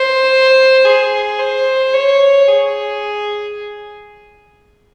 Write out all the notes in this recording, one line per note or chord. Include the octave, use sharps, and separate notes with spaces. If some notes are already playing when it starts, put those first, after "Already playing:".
Already playing: C5
G#4
C5
C#5
G#4